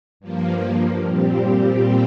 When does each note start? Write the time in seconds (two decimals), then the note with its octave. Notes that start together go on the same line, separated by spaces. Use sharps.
0.20 G2 F3 A#3
1.06 A#2 G3 C4 G4